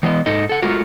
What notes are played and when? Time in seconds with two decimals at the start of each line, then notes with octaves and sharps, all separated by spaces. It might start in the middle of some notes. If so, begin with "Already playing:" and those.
0.03 E3 G#3 B3 D#5
0.26 G#2 D#4 A4 D#5
0.49 A4 F#5
0.62 G#3 A3 F4 F#4 A#4